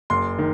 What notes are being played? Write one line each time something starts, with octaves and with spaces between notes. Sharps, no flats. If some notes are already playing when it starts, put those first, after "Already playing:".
F#1 C6
D#3